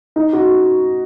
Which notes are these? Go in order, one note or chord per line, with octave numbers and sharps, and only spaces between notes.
D#4
F#4